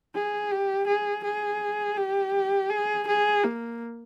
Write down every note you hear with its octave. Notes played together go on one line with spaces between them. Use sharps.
G#4
G4
G#4
G#4
G4
G#4
G#4
A#3